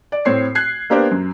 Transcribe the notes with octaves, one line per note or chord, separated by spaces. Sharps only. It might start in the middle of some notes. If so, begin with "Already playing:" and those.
D5
A2 C4 C#5 C7
F#6 G#6 C7
A#3 B3 D4 G4 A#4 C5
F#2